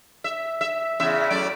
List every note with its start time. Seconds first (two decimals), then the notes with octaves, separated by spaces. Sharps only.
0.24 E5
0.61 E5
1.00 E2 C#3 E5
1.30 F#2 A3 D5